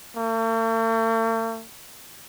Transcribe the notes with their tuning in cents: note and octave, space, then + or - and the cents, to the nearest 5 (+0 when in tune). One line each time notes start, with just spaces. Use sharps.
A3 +45